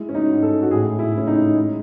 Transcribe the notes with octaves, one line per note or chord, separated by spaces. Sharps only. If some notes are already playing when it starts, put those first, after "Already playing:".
Already playing: G#3 E4
C#4
D#4
G#2
A4
F#4
A2 G#4
E4
A2 C#4
D#4
G#3